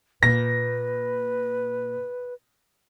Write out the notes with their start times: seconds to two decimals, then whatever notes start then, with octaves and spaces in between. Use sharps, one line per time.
0.23 A#2 B4 A#6